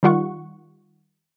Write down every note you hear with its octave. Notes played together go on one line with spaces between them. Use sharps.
D#3 G3 F4 F#5 C#6